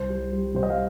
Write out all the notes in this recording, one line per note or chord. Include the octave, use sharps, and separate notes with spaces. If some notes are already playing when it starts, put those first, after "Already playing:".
Already playing: C2 C5
G3
G3
C3 C5
D#5
F5